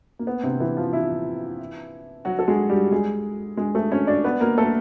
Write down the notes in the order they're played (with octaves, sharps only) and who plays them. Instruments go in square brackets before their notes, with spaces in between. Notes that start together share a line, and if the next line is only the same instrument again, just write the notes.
[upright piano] A#3
B3
C3 C4
E3 E4
F3 F4
E3 E4
F#3 F#4
A4
G#3 G#4
G3 G4
G#3 G#4
G#3 G#4
A3 A4
C#4 C#5
D4 D5
B3 B4
A#3 A#4
A3 A4